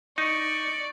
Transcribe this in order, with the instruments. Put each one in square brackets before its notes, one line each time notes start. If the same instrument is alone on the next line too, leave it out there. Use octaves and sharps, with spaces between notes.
[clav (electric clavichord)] D#4 [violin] D5 [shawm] C#6